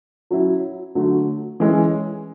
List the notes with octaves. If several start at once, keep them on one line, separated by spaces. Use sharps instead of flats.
F#3 C#4 E4
D3 F#3 A3
E3 G#3 C#4